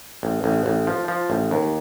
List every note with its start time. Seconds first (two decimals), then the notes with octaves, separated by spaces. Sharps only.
0.23 A1
0.44 A1
0.66 A1
0.87 F3
1.08 F3
1.30 A1
1.51 D#2